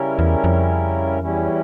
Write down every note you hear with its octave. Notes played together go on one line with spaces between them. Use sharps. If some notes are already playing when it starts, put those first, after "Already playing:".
Already playing: C#3 G3 C#4 E4 A#4
E2
F2
E2 E3 G3 C#4 E4